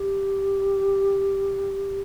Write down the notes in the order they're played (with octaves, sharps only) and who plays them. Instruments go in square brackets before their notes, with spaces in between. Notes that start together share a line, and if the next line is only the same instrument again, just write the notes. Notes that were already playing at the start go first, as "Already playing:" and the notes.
Already playing: [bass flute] G4